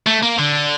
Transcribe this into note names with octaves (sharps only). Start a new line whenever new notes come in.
A3
A#3
D3